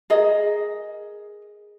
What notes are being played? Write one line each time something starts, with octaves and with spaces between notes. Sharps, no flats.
G#4 A#4 D#5